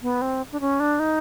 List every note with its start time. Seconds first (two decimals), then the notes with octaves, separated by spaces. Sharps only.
0.03 B3
0.22 C4
0.52 D4
0.60 C#4
0.80 D4
1.00 D#4